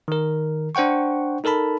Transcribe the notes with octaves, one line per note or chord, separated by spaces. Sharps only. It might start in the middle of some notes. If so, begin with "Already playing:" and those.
D#3 A#4
D4 C5 F#5 G5 C#6
D#4 A4 A#4 A5 B5